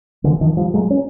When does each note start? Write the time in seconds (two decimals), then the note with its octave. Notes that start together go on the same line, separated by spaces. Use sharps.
0.24 D3 E3
0.41 D#3 F3
0.57 F3 G3
0.74 F#3 G#3
0.90 C#4